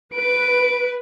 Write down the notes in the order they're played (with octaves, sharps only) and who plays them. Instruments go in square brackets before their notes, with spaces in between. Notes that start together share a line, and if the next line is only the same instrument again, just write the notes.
[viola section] B4 [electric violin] D7